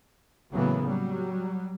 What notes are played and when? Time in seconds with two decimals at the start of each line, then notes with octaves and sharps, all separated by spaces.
0.52 A2 C#3 E3 F#3 A#3 B3
0.85 F#3 G3